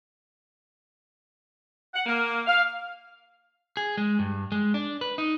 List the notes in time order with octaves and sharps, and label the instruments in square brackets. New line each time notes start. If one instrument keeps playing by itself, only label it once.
[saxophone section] F#5
A#3
F5
[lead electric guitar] G#4
G#3
G2
G#3
D4
B4
D#4